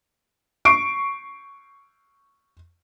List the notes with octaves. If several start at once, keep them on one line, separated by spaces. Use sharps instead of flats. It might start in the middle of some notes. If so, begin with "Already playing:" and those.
C#6 C7 D7